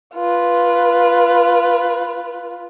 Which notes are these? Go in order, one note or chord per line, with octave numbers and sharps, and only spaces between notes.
F4 B4